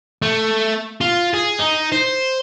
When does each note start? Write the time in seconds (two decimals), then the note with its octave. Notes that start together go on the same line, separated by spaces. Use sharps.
0.22 A3
1.01 F4
1.34 G#4
1.59 D#4
1.92 C5